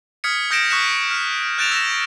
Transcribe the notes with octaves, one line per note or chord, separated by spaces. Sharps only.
D#6 F6 G#6 B6 C#7
D#6 G6 A#6 C#7 D7 E7
C#6 D#6 F#6 B6 C#7 E7
F6 E7
F#6 G6 A6 D7 E7 F7
E6 A#6 E7